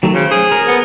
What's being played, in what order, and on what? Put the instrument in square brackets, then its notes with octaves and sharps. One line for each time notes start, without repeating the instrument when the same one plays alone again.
[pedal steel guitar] D#3 F#3 A3
[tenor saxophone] C#3 [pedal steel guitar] C5
[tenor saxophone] G#4
[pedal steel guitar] A#4
[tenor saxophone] B3